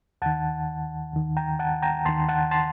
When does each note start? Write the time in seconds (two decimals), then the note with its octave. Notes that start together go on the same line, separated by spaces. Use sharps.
0.22 D#2 D#3 F#5 A5
1.14 D#2 D#3
1.37 G5 A#5
1.59 F#5 A5
1.82 G5 A#5
2.05 D#2 D#3 A5 C6
2.29 F#5 A5
2.51 A5 C6